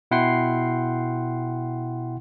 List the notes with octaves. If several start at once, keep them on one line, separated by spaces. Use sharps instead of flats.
B2 E4 F#5 G5 C6 C7